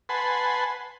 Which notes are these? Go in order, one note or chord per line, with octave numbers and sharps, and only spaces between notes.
B4 F#5 G#5 A5 B5 C6